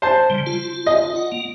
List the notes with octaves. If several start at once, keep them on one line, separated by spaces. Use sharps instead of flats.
C5 A5
C#3 G3
F4
D#5
F#5
A#3